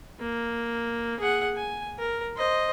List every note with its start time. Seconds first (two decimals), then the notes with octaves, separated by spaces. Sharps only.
0.20 A#3
1.20 G#4 F#5
1.56 G#5
1.99 A#4
2.37 C5 D#5